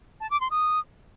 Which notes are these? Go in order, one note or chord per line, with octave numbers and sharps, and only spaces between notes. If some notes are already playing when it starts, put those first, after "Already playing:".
A5
D6
C6
D#6